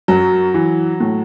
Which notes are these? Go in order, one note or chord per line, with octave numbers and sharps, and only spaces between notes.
F#2 F#3
E3
A2